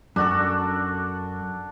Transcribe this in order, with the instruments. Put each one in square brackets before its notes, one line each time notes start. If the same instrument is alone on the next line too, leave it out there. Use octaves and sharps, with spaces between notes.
[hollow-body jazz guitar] F#2 [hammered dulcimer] D4 F#4 A4